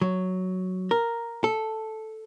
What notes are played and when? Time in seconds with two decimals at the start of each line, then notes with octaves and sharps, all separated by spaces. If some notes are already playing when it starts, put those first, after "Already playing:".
0.02 F#3
0.91 A#4
1.44 A4